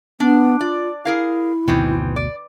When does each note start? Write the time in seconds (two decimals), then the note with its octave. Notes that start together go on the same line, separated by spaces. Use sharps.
0.20 B3 D4
0.61 F4 D5
1.05 E4 G#4 A#4 F5
1.68 F#1 D2 B2 D#3 E3 C4
2.16 D5